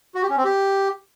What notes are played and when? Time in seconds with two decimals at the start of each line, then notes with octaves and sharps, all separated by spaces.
0.15 F#4
0.22 G4
0.30 C#4
0.37 C4
0.45 G4